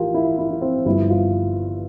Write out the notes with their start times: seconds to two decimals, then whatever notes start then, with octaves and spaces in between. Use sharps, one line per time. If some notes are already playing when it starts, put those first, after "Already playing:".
Already playing: A1 F3 E4 F4 G4 A#4
0.14 E4
0.38 E4
0.51 E4
0.62 C4
0.85 G1 G2 F3 E4
1.10 F4